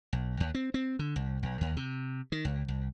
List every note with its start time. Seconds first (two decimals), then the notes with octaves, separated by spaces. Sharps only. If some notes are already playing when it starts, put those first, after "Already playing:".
0.13 B1
0.40 D#2
0.55 C4
0.74 C4
0.99 D3
1.16 C2
1.43 B1
1.61 D#2
1.77 C3
2.32 D#3
2.45 C#2
2.68 C2